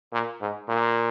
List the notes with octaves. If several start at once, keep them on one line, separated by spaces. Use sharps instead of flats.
A#2
G#2
A#2